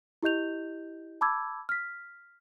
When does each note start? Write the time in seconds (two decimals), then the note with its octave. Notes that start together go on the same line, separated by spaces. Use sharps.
0.23 E4 G4 D#5 G6 F7
1.21 A5 B5 D6 E6 G#6
1.69 F6 B6